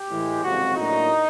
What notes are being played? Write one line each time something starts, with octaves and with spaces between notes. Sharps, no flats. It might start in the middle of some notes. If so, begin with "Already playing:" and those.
Already playing: G4
A2 E3 G#3
F#1 F2 C3 F3 G#3 F#4
A2 F#3 A#3 D4 D#4